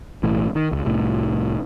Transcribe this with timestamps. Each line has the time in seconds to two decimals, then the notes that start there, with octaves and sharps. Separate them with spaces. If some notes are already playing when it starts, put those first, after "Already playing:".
0.23 B1 A2 E3
0.55 D#3
0.72 C#2
0.85 C2 A2